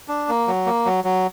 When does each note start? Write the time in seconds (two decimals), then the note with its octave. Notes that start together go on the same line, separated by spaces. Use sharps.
0.08 D4
0.29 A#3
0.47 F#3
0.66 A#3
0.85 F#3
1.04 F#3